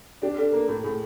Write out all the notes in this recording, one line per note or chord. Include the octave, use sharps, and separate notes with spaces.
D4 G4
D4 A4
A#3 A#4
A2 A4
A2 G#4